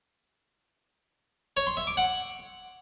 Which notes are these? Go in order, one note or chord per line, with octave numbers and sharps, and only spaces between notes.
C#5
C6
E5
D6
F#5